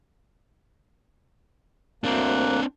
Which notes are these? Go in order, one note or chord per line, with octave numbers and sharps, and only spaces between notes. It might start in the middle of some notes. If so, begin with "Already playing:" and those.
D2 A#3 C4 D4 F#6